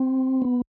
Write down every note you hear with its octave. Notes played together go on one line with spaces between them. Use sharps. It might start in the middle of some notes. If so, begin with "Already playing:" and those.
Already playing: C4
B3